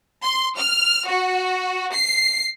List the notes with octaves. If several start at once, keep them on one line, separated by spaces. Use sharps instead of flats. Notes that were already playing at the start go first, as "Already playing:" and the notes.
C6
F6
F#4
C7